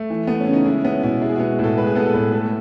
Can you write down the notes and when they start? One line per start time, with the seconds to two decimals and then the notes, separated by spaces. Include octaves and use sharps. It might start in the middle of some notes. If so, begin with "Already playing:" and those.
Already playing: A3
0.10 E3
0.27 A3 B3
0.40 C#4
0.47 C#3
0.53 D#4
0.65 G#3 E4
0.84 B3 C#4
1.03 B2 E4
1.22 G#3 E4
1.29 G#4
1.36 B3 F#4
1.59 A2 A4
1.78 G#3 B4
1.87 G#4
1.95 B3 A4
2.06 A4
2.14 A2 B4
2.33 A3 A4